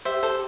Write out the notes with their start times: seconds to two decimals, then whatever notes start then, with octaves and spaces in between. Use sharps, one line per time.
0.05 G4 C5 E5
0.23 A4 C5